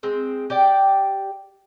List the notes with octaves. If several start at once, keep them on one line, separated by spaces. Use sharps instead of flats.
G#3 C4
G4 D5 G5